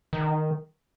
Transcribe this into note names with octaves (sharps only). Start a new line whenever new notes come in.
D#3